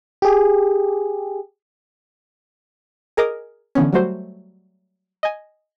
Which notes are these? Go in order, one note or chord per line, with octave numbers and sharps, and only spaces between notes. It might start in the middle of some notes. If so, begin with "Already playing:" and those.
G4 G#4
G#4 A#4 D#5 D6 D#6
D3 E3 B3 C#4
F#3 G3 A3 F#4 C5
D#5 G#5